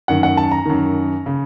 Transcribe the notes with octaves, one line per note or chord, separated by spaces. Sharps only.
F#2 D#3 F#5
F#5
A5
A#5
F#2 D#3
C#3